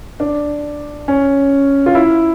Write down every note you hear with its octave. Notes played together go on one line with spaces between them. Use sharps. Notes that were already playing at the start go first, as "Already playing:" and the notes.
D4
C#4
F4
E4